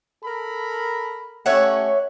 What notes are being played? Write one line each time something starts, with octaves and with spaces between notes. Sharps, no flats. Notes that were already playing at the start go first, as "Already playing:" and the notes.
A4 A#4 B5
A3 C#4 G4 C#5 E5 F#5